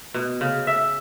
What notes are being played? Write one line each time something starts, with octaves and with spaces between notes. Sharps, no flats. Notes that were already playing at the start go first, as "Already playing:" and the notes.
B2
C#3
E5